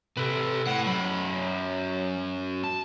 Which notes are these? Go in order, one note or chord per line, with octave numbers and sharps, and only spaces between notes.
C3 A4 B4
A2 F#5
F#2 F#3 B5
A5